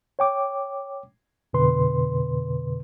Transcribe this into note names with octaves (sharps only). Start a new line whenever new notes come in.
C#5 G5 D6
F2 B2 D3 B4 C6